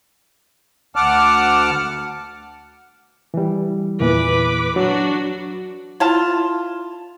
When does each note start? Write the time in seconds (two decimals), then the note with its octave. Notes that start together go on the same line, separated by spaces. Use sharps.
0.96 D2 F#5 A5 D6 F6
3.34 E3 G3
4.00 E2 A#2 E3 B4 D6
4.76 F#3 D4 F#4
6.00 E4 F4 A5